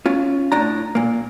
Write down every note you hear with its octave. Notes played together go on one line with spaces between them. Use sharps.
C#4 F4
A2 D4 A#5
A#2 A#3